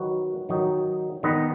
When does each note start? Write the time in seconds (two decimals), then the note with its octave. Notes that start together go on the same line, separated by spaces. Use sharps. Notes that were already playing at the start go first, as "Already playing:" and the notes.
Already playing: D#3 F#3 D#4 F#4 B4
0.49 D#3 F#3 D#4
1.23 D#3 B3 D#4 B4 D#5